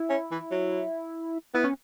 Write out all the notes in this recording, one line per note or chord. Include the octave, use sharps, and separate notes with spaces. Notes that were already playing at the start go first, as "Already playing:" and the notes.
Already playing: E4
C#4
E3
F#3
B3 E4
C#4